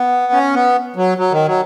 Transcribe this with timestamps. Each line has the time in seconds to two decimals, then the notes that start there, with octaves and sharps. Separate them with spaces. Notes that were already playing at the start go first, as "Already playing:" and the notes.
Already playing: B3
0.32 C#4
0.54 B3
0.96 F#3
1.18 F#3
1.32 D#3
1.46 F#3